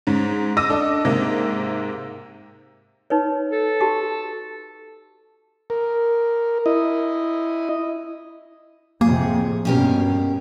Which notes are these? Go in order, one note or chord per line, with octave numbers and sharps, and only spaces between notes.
G#2 C#4
D#5 D6 E6 A#6 D#7
D4 A4 D#5
G#2 C3 A#3
D#4 B4 C#5
A4
F#4 G4 A5
A#4
E4 D#5
F2 A2 C3 A#3 G#4
G2 B2 C#4 G4 A#4